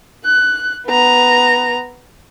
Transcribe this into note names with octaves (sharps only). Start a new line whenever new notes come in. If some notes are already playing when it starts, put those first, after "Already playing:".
F#6
B3 A#5